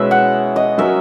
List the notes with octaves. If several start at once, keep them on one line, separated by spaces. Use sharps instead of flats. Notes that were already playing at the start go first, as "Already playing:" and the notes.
Already playing: B2 G#3 C#4 E4 B4 E5
F#5
D#5
F#3 C#4 F#4 A#4 E5